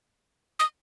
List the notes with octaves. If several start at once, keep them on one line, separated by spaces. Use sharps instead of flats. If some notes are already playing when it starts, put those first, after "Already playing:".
D#6